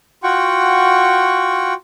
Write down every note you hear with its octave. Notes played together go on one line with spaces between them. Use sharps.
F4 F#4 F#5 G5 C#6